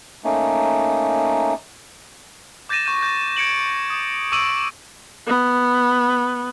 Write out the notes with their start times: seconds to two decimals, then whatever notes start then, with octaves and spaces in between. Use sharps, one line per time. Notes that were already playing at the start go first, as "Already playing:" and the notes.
0.24 A3 A#3 C#4 D#4
2.69 D6 G6 A6 A#6 D#7 E7
2.86 C#6 G6 D#7
3.03 G6
3.36 G#6 C#7 D7 F#7
3.90 D#6
4.32 C#6 D6 E6 D7 D#7 F#7
5.27 B3